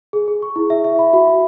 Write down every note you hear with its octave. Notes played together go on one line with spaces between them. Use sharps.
G#4
G#4
C#6
E4
E5
E5
B5
F#4
F#4